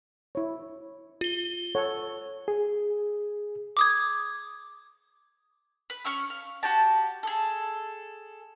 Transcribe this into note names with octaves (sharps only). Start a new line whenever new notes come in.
E4 C#5
F4 G7
A4 C#5 F#5
G#4
D6 D#6 G#6
B4
C#4 C#6 E6
F5
F#4 G4 A5
G#4 A4